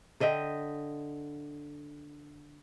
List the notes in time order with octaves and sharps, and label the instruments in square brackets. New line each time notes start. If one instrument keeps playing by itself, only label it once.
[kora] D3 D#5 E5 G5